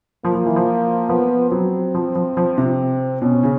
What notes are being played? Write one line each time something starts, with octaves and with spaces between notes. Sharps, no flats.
F3 A#3
F3
E3
F3
F3 B3
F#3 C4
F3
F3
F3
C3
B2 C#4
C#3